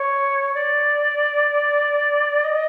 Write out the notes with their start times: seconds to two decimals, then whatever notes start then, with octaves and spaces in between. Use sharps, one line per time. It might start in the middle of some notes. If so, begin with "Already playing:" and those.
Already playing: C#5
0.54 D5
2.44 D#5